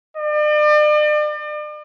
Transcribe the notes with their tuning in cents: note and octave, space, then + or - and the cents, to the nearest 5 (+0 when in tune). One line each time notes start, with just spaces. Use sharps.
D5 +40